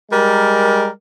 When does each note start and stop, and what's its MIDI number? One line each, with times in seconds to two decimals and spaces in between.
0.11 0.87 55
0.11 0.87 56
0.11 0.87 70